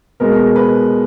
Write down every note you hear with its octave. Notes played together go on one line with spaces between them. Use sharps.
B2 G#3 B3 A#4
B4